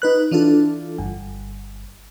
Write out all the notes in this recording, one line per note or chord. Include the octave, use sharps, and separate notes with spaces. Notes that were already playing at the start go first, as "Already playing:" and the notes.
D#4 B4 F#6
E3 D4 F4 A4
G1